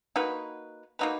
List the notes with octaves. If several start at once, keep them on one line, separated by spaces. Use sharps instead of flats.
A#3 D#4 F#4 B4
A#3 D#4 F#4 B4